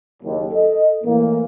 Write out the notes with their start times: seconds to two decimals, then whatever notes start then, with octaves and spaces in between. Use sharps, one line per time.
0.23 F#1 D#2
0.51 A4 D#5
1.04 A2 E3 A#3